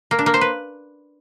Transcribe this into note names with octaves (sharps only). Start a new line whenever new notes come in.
A#3
D4
A#3
C5
B4